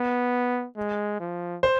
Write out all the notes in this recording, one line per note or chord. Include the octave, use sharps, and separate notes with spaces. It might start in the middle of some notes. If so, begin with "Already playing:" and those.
Already playing: B3
G#3
F3
C5